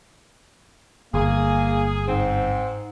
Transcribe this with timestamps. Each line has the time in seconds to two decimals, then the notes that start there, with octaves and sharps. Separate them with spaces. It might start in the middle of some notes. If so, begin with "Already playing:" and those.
1.14 G1 A#3 G#4
2.08 G#2 C4